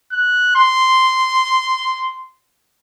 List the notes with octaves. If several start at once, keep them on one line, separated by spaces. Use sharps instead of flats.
F#6
C6